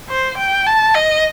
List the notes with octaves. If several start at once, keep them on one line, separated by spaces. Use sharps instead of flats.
C5
G5
A5
D#5